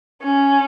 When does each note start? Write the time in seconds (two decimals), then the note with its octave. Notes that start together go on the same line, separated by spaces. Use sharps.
0.23 C#4